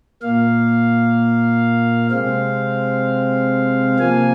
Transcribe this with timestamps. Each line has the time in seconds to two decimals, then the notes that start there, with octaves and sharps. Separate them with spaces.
0.22 A#2 A#3 F5
2.11 C3 G#3 C4 F5
3.99 C3 F3 A#3 G#5